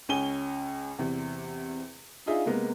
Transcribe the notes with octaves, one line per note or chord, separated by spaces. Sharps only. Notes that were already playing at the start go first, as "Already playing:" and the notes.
C#2 C#4 G#5 D#7 G7
E2 C3
D4 D#4 F4 G#4 E5 F5
C3 G#3 A#3 B3